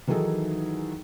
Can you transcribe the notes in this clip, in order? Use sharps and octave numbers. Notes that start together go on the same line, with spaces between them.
D#3 E3 F#3 D#4 G#4 A4